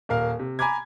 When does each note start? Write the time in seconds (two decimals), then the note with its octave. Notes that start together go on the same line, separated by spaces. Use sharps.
0.09 D#1 A#4 F5
0.39 C3
0.59 G#5 A#5 B5 D6 G#6